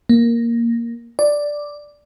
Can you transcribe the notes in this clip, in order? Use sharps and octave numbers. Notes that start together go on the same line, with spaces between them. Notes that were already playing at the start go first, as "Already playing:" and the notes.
A#3
D5